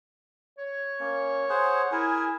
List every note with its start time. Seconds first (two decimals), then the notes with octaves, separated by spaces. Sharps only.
0.58 C#5
1.00 A#3 C#4
1.49 G#4 C5 F#5
1.92 E4 G#4 A#4 G#5